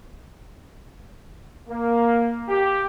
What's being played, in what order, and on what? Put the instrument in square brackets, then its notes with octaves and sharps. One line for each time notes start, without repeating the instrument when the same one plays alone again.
[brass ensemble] A#3
G4